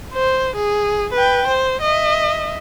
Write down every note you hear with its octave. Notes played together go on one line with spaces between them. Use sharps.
C5
G#4
B4 G5
C5
D#5 E5